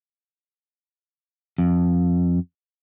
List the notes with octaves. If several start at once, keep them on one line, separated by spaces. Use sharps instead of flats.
F2